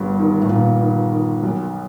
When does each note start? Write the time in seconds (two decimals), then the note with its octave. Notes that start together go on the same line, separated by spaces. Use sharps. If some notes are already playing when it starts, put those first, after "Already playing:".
Already playing: G1 G2
0.19 D#3
0.42 A2
0.49 A#2 D#3
0.80 D#3
1.12 D#3
1.43 B1